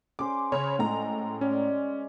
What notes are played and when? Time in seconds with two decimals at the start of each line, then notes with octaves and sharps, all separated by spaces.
0.19 C#4 G#4 C5 D6
0.52 C#3 C#5
0.79 A2 G#3 A#5
1.41 C#4 D5